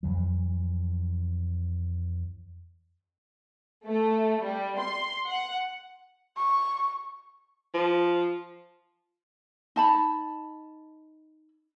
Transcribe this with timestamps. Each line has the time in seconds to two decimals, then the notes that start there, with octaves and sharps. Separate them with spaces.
0.03 F2 E3 F#3
3.86 A3
4.42 G3
4.77 C6
5.26 F#5
6.37 C#6
7.74 F3
9.76 D#4 A5 B5